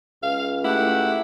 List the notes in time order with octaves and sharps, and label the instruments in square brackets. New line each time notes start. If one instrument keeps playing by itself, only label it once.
[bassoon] C#2 [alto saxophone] F5
[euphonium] A3 [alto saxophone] E4 [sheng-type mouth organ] G4 F#5